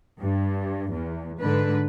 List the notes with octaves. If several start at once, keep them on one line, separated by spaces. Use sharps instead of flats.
G2
E2
G#2 D3 B4